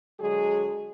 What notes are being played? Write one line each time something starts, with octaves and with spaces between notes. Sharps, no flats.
D3 F#3 G#3 G#4